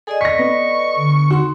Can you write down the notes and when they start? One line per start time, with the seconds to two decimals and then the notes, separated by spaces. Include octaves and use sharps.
0.07 G#4 A4 D5 D#5
0.21 C#6 A#6 B6
0.39 B3
0.97 D3
1.31 D#4 F#4 C6